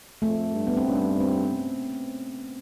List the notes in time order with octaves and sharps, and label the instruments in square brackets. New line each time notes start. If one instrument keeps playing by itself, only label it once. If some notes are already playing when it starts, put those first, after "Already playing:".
[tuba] F2 [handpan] A3
[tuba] G2
[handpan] B3
C4
[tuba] G2 [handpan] C#4
[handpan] C4